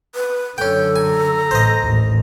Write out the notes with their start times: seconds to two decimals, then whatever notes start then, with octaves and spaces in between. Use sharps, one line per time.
0.15 B4
0.58 F#2 D3 C#4 A4 G5
0.96 G#5 A#5
1.51 A1 C5 D#5
1.82 A1 D#2